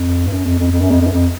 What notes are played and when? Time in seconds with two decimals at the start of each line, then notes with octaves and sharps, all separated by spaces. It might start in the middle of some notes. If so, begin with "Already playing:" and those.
Already playing: F2
0.27 G2
0.32 F#2
0.46 F2
0.59 F2
0.71 F2
0.81 F#2
0.91 F2
1.01 F2
1.07 F#2
1.12 F2